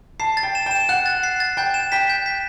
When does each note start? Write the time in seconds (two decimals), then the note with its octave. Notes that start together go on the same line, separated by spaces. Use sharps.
0.20 A5 C7
0.37 A6
0.43 G5
0.55 E7
0.66 G5 E7
0.89 F#5 F#6
1.06 A6
1.23 C7
1.40 A6
1.57 G5 G6
1.74 E7
1.92 G5 B6
2.10 G6
2.26 B6